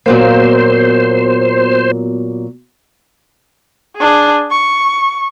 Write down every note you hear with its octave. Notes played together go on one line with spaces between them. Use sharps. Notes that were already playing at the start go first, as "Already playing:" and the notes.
A#2 F#3 A#3 B3 F#4 C5
D4 G#4
C#6